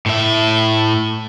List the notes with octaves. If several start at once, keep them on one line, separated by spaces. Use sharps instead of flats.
A2 E5